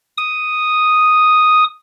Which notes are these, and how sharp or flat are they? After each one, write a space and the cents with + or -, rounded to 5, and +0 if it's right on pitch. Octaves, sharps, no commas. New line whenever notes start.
D#6 +0